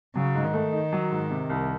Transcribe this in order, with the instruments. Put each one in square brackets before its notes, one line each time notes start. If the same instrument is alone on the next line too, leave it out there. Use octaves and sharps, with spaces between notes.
[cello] C#3 [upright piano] F#3
[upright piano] G#2
[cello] D#3
[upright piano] A3
D#4
F#3
G#2
C3
C2